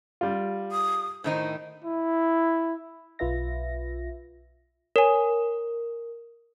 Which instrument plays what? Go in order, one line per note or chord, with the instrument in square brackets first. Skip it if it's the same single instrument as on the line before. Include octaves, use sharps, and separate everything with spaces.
[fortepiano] G3 F4
[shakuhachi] D#6
[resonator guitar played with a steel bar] A2 D#3 D#4 [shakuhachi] C5
[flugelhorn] E4
[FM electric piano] B1 F4 B4 E5 A#6
[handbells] A#4 [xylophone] C#5 G#5